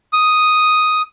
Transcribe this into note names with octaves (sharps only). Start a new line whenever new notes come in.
D#6